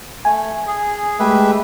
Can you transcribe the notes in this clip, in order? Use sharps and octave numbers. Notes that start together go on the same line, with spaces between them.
A3 G#5
G#4
G#3 A3 G4 B4 E5